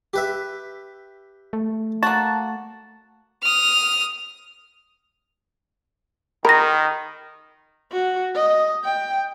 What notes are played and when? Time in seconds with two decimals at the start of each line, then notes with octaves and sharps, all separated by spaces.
0.14 G4 B4 E5
1.53 A3
2.03 A#3 F#4 A5
3.43 D#6 F6
6.45 D#3 A#4 B5 A#6
7.92 F#4
8.35 D#5
8.84 G5